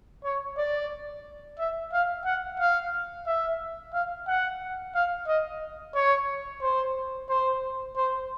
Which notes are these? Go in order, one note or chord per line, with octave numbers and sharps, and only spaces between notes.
C#5
D5
E5
F5
F#5
F5
E5
F5
F#5
F5
D#5
C#5
C5
C5
C5